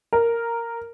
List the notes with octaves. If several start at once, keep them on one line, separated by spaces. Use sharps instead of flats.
A#4